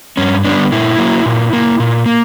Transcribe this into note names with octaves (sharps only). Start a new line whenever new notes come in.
G2 C#4
D3 G3 B3 D4
A#2 E4
F#3 A#3
A#2
A#3
A#2
A#3